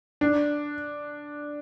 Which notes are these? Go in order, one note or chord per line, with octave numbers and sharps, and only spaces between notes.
D4